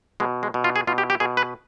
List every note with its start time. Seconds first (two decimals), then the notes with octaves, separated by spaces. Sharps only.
0.20 B2 G#3
0.43 G#3
0.54 B2
0.64 F4
0.76 G#4
0.87 B2 F4
0.98 G4
1.10 G4
1.20 B2 G#4
1.37 B4